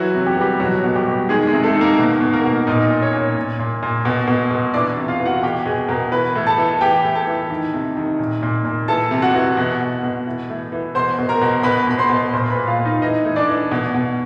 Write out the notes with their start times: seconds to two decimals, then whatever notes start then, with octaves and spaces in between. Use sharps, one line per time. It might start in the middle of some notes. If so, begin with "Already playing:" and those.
Already playing: E3 F#3 F#4
0.15 C3
0.26 G4
0.33 F#4
0.37 E3 G3 G4
0.60 B2 F#3 F#4
0.84 B2
0.95 G3 G4
1.07 B2
1.29 D#3 G#3 G#4
1.46 G#3 G#4
1.52 C3
1.63 A3 A4
1.75 D#3
1.81 A#3 A#4
1.99 B2
2.21 B2
2.33 A#3 A#4
2.44 B2
2.67 A#2 D#4 D#5
2.90 A#2
3.01 C#4 C#5
3.13 A#2
3.37 A#2
3.59 A#2
3.83 A#2
4.05 B2
4.28 B2
4.51 B2
4.74 E3 D4 D5
4.97 C3
5.08 F4 F5
5.20 E3
5.26 F#4 F#5
5.43 B2 G4 G5
5.66 B2 G#4 G#5
5.89 B2 A#4 A#5
6.12 E3 B4 B5
6.35 A2
6.47 A4 A5
6.58 E3
6.81 E3 G4 G5
7.04 A2
7.15 A4 A5
7.27 E3
7.50 D#3
7.73 C3
7.97 D#3
8.19 A#2
8.43 A#2
8.65 A#2
8.88 E3 A4 A5
9.11 C3
9.22 F#4 F#5
9.34 E3
9.57 B2
9.81 B2
10.03 B2
10.26 E3
10.49 A2
10.72 E3
10.95 B2 C5 C6
11.19 B2
11.29 A#4 A#5
11.42 B2
11.63 B2 B4 B5
11.87 B2 B5
11.98 C5 C6
12.09 B2
12.33 A#2 C5 C6
12.50 B4 B5
12.55 A#2
12.67 F4 F5
12.79 A#2
12.85 D#4 D#5
13.02 E3 D#4 D#5
13.25 A2
13.36 D4 D5
13.49 E3
13.72 B2
13.94 B2